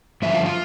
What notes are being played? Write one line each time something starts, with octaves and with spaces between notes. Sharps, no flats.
G2 D3 F3 E5
F4 F5
F4 F5